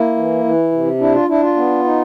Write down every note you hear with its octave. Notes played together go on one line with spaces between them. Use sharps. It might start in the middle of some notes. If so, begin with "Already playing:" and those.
Already playing: A#3 E4
E3
E3
C3
D4 E4
F4
D4 E4
F4
B3
D#4